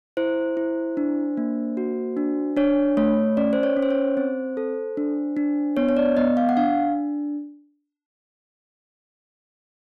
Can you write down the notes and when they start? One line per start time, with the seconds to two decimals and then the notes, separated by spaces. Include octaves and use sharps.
0.17 E4 C5
0.57 E4
0.97 D4
1.37 A#3
1.77 F#4
2.17 D4
2.57 D4 C#5
2.97 A3 C#5
3.37 C#4 D5
3.53 C5
3.63 C#5
3.77 C#4
3.83 C5
3.91 C#5
4.17 C4 C5
4.57 A4
4.97 D4
5.37 D4
5.77 B3 C#5
5.89 C#5
5.97 D5
6.17 B3 D#5
6.37 F5
6.49 F#5
6.57 D4 F5